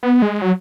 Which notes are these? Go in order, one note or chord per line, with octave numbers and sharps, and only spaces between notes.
B3
G#3
F#3